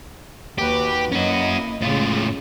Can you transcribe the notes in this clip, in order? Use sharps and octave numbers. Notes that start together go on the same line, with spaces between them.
D#2 F#4 G4 B4
A#3 C#4 E4 F#4 D#5
A2 C#3 G#3 F4